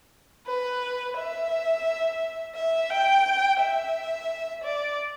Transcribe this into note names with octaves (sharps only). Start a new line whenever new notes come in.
B4
E5
E5
G5
E5
D5